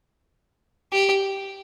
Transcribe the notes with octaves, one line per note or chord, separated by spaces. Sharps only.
G4